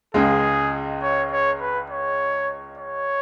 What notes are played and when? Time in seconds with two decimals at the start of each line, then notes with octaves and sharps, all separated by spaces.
0.14 C#2 C#3 G#3 G#4
1.03 C#5
1.32 C#5
1.60 B4
1.90 C#5
2.77 C#5